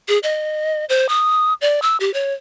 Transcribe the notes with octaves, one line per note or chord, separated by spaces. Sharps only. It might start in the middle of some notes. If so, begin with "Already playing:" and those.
G#4
D#5
C5
D#6
D5
E6
G4
C#5